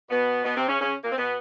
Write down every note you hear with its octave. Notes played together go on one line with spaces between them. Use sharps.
B2 B3
B2 B3
C3 C4
C#3 C#4
C#3 C#4
A#2 A#3
C4
B2 B3